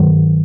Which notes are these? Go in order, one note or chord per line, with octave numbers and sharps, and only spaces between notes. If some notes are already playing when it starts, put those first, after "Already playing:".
Already playing: G2 D#3 F#3